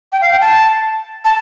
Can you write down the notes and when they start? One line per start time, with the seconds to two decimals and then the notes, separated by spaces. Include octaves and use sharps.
0.12 G5
0.21 F5
0.31 G5
0.41 A5
1.24 A5